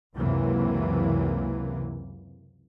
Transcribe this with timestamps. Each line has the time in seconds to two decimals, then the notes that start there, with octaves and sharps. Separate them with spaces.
0.16 C#2 F#2 C3 E3 A#3